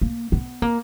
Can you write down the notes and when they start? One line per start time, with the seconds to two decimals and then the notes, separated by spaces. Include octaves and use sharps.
0.01 A#3
0.32 B3
0.62 A#3